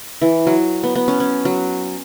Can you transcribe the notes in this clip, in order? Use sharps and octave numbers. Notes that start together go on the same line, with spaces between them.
E3
F#3
B3
B3
C#4
C#4
F#3